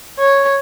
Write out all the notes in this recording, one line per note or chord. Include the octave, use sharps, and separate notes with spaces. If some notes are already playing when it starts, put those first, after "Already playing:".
C#5